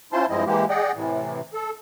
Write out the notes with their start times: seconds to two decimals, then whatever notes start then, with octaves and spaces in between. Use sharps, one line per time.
0.13 C#4 E4 F4 C5 A5 C6
0.30 G2 F3 G#3 C4 E4 D#5
0.46 E3 G#3 A#3 G4
0.69 G#4 D5 D#5 F#5 G5
0.95 A2 C3 E3
1.54 A4